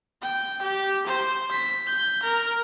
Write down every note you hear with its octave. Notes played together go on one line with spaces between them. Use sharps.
G5
G4
C5
B6
G6
A#4